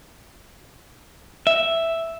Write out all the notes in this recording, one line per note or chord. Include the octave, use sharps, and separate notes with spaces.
E5